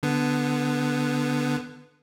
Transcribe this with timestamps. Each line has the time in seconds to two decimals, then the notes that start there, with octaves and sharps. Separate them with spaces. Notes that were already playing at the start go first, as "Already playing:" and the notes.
0.03 D3 B3